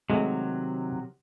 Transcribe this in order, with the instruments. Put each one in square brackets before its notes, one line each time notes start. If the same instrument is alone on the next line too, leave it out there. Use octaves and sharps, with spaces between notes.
[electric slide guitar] C3 D#3 F#3 [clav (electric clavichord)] G#3 A3